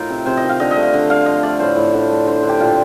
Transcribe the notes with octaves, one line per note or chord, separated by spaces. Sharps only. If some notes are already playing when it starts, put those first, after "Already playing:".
Already playing: A2 D#4 F4 A#4
C3
C3 C5
D#5
D#3
F5
D3 D#5
D#5
A3
F5
D3 D#5
D3 F5
F3 D#5
A3 D5
A2 C5
A2
D3
A3
D3 C5
D3
G4
A#2 F4